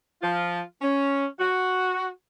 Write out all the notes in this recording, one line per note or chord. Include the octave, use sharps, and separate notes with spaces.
F3 F4
C#4
F#4